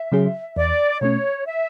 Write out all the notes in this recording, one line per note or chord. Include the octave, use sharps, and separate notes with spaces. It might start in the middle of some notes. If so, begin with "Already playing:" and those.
Already playing: E5
C#3 F#3 C#4 G#4
E2 D5
B2 A3 C#4 C#5
E5